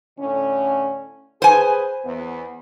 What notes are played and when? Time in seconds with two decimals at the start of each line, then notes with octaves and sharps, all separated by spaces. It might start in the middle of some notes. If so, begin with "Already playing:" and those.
0.19 A2 D3 C#4
1.42 G#4 B4 C5 G#5
2.05 E2 B3